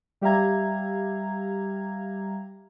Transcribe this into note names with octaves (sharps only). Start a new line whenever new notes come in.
G3 G4 E5 F5 A#5 G#6